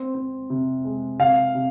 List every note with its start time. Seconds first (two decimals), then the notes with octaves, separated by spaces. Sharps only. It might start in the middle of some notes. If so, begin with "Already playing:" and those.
Already playing: C4
0.14 C4
0.50 C3
0.84 G#3
1.19 C3 F5
1.55 C3